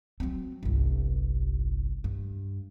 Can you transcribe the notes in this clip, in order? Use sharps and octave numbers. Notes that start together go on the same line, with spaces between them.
F#3 C4
G1 C2
G2